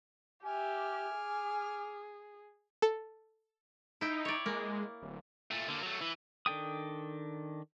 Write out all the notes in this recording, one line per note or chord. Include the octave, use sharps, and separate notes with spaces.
G4 E5 G#5 D6 F6
G#4
A4
D#4 E4 G5
C#5 D5
G#3 A#3
D1
A#2 A3
D3 A#3
F#3 A3
E3
D#3 D4 A4 G5 D#6